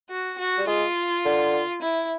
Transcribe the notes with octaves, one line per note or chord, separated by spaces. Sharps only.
F#4
F#4
G3
G#3 F4
D3
E4